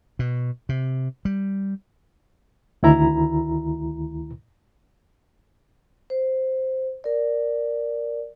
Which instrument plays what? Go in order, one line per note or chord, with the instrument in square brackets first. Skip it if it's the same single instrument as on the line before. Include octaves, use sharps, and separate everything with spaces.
[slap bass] B2
C3
G3
[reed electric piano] D2 D#3 E4 A#5
[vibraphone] C5
A#4 D5